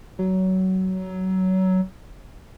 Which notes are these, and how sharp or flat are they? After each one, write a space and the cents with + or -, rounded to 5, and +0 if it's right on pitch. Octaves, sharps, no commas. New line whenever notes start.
F#3 +20